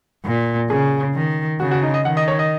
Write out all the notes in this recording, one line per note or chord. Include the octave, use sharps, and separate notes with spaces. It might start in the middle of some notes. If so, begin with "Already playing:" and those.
A#2
C#3 G#4
D#3
C#3 F#4
F#4
D#4
D#5
D#3 F#5
D#5
C#5
D#5